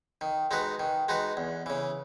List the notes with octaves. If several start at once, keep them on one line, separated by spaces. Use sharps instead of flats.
D#3
G#3 D#4 F#4 B4
D#3
G#3 D#4 F#4 B4
E2
C#3 E3